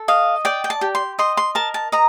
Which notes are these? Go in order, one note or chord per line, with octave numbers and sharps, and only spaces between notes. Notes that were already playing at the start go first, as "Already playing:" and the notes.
Already playing: A4
D#5 F5
D5 G5
G5
A5
G4
C6
D#5 C6
C6
A#4 A5
A5
D#5 A#5